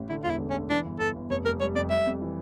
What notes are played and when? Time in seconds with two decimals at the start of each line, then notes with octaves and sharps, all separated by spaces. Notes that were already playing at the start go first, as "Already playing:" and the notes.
Already playing: A1
0.09 D3 E4
0.24 E1 F4
0.30 E4
0.39 D3
0.50 C#4
0.55 D3
0.70 E3 D4
0.85 G1
1.00 G1 A4
1.16 G1
1.30 F1 C#5
1.45 F1 A#4
1.60 G3 C#5
1.75 F2 D5
1.90 G3 E5
2.07 F2
2.21 E3